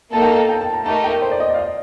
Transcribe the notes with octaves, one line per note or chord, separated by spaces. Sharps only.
A#3 D#4 A4 A5
G5
F5
A5
G5
A5
A#5
A3 D#4 G4 A#4 A5
G5
C5
D5
D#5
D5
F5
D#5